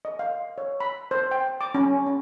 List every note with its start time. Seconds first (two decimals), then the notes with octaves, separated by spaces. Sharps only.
0.05 D#5
0.19 F5
0.58 C#5
0.80 B5
1.11 C5
1.31 G5
1.61 D6
1.75 C#4
2.07 C#4